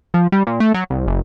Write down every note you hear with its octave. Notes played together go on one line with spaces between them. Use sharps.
F3
G3
A#2
A3
F#3
C2
F#1